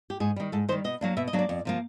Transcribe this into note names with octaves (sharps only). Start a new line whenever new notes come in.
G4
G#2 G#4
D#3 G3
G#2 A4
D#3 G3 C5
B2 D#5
F#3 A#3 D4
B2 E5
D#5
F#3 A#3 D4
D5
F2
C3 F3 A#3